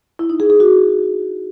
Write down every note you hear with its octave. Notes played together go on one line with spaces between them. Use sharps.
E4
D#4
G#4
G#4
F#4